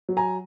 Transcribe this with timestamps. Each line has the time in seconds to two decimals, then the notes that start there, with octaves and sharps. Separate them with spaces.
0.09 F#3
0.17 G#5 A#5